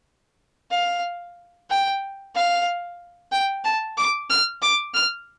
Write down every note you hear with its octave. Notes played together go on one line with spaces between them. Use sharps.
F5
G5
F5
G5
A5
D6
F6
D6
F6